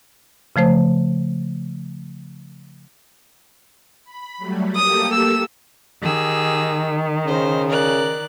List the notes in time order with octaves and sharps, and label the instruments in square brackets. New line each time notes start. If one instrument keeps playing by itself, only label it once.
[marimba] C#3 F3 A3 C5
[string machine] B5
F#3 G3 A3
[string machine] A#3 G4 A4 [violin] D#6
[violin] E6
[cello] D#3 [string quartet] G4 G#4 E6
[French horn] C#3 [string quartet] C5
[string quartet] A#4 D5 F#6